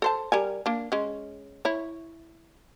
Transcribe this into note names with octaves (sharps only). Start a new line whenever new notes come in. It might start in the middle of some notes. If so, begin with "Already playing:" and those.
A4 C5 A5
G3 A#4 G#5
A#3 D4
G#3 C#4
E4 C#5